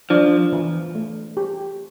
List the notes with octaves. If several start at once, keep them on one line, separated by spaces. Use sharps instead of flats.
F3 D4
E3
A3
G4